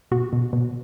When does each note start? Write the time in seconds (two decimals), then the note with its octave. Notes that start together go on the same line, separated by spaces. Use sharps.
0.11 B2 F#4
0.33 B2
0.53 B2